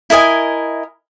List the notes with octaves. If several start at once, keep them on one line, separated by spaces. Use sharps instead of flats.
E4 A#4 D#5 G#5